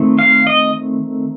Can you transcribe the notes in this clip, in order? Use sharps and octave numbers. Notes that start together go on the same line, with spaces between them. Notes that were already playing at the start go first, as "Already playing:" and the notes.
Already playing: D#3 A3 C4
F5
D#5